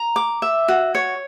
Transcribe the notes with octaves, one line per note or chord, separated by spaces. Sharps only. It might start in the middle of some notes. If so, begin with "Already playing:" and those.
Already playing: A#5
D6
E5
F#4
C#5